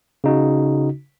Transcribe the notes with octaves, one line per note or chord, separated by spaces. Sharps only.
C#3 D#4 F#4